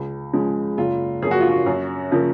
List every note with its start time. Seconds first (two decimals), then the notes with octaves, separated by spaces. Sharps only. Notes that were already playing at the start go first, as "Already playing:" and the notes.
Already playing: C#2
0.33 C#3 F3 G#3
0.78 F#1 F4
1.22 F#2 F3 A#3 G#4
1.31 F#4
1.40 F4
1.49 F#4
1.66 F#2
2.11 C#3 F3 A#3